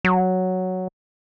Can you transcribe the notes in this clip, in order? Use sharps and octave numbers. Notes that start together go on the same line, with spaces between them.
F#3